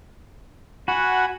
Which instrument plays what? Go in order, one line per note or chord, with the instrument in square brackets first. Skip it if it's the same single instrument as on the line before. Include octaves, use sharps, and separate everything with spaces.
[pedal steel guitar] F#4 [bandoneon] F#5 G#5 B5